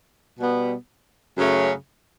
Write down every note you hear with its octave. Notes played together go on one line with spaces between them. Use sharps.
B2 G3 B3
F#2 C#3 F#3 A3 C#4